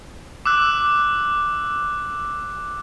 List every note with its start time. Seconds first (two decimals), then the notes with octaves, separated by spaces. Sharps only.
0.46 D6 E6 F#6